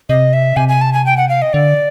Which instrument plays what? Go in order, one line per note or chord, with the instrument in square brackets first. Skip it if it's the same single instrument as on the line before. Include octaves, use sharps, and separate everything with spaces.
[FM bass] C3 [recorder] D#5
[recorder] E5
[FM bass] C3 [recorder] G#5
[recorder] G#5
A5
G#5
G5
F#5
F5
D#5
[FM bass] D3 [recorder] D5